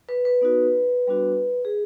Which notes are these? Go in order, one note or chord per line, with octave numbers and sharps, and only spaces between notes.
B4
B4
B3 D#4 F#4
G3 B3 D4 F#4
G#4